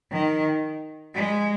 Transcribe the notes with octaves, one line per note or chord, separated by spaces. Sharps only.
D#3
G#3